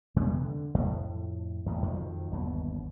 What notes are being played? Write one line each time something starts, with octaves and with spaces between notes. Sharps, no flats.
E2 C3 G#3 B3
D3
F2 A2
E2 A2
F2 D#3 F3 F#3
G1 D#2 B2 F#3